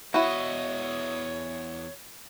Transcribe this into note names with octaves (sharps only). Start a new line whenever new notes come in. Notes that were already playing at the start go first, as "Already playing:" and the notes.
E2 E4 F#4 C#5 D#5